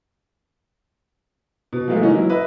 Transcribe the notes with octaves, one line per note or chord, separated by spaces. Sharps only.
B2
F3 F#3 G#3 A3 F4
E3 G#3 A#3 C#4 D#4 F4
F#3 E4
B4 D#5 E5